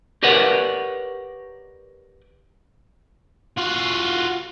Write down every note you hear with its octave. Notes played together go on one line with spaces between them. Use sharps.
G4 A#4 B4 C#5 D5 F#5
F4 F#4